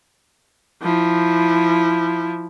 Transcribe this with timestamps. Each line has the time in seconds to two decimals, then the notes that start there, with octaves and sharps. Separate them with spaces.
0.82 F3 E4